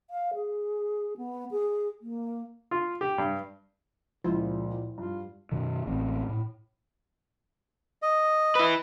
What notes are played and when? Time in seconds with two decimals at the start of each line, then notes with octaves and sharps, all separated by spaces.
0.10 F5
0.34 G#4
1.17 B3
1.51 G#4
2.02 A#3
2.71 F4
3.01 G4
3.18 G2
4.24 C#2 A#2 F3 E4 F4
4.98 G2 F4
5.52 F#2 B2 D#3
5.87 A1 C4
6.29 A2
8.02 D#5
8.55 E4 B4